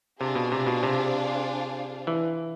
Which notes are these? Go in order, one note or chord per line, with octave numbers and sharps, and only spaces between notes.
C3 D4 F4 G#4 C5 F5
B2
C3
B2
C3
E3